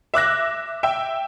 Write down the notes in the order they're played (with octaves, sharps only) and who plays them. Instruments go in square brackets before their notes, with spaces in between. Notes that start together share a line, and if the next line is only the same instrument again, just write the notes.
[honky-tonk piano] E5 D6 F#6 A#6
E5 G5